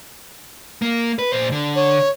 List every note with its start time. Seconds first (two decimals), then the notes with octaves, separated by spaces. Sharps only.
0.82 A#3
1.19 B4
1.33 A#2 C5
1.52 D3
1.76 C#5